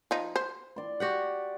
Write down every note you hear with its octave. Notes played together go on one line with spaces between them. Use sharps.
F3 D#4
C5
D5 C6
F#4 G4 F#5